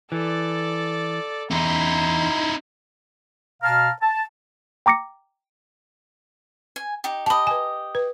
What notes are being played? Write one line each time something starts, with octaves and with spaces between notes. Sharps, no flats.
E3 A4 D5
E2 D#4 E4 A#5 C6
B2 F5 A5 A#5 F6
A5
G5 A#5 D6 A#6 C#7
G#5
D#4 G4
G4 D#5 A5 B5
B4 G#5
B4